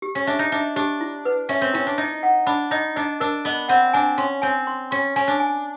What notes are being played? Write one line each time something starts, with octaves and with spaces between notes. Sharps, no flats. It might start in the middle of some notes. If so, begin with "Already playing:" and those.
G4
C#4
D4 E5
D#4
D4 E5
D4 G4
E4
B4
C#4 E5
C4
C#4 E4
D4
D#4 D#5
F#5
D4 B5
D#4 D#5
D4 D#5
D4 A#4
B3 D#5
C4 F#5
D4 G#5
C#4 C6
C4 G#5
C6
C#4 C6
C#4 G#5
D4
G#5